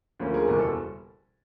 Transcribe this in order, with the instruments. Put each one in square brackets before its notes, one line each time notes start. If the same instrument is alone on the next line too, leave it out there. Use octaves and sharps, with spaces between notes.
[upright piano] D2 D3 F3 A#3 C#4
G#4 A#4
F#1 E2 B2 G3 A#4
A4